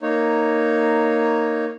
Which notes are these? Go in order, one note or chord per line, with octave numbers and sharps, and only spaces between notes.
A#3 D#4 C#5